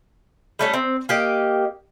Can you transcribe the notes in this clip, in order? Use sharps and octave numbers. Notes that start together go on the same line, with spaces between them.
G3 A3 C#4
C4
A#3 G4 D#5